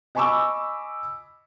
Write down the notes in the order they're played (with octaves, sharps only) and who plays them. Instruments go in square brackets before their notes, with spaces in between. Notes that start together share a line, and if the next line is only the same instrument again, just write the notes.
[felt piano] D#5 G#5 B5 C#6 D6 E6